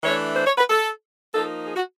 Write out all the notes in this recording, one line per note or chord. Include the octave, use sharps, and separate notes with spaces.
E3 A3 D4 C#5
C5
C#5
B4
A4
F3 A#3 D#4 A4
G#4
F#4